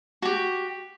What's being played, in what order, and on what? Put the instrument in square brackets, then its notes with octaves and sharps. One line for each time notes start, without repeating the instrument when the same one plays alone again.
[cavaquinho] F#4 G4